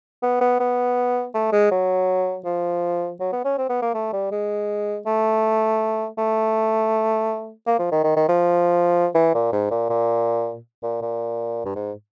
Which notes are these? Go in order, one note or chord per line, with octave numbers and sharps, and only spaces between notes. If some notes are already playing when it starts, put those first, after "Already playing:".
B3
B3
B3
A3
G#3
F#3
F3
F#3
B3
C#4
C4
B3
A#3
A3
G3
G#3
A3
A3
A#3
F3
D#3
D#3
D#3
F3
E3
A#2
G#2
A#2
A#2
A#2
A#2
G2
G#2